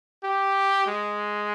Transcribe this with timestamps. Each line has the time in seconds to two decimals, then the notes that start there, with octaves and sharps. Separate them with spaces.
0.24 G4
0.86 G#3